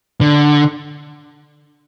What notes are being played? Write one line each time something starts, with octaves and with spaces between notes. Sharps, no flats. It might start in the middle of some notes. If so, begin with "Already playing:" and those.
D3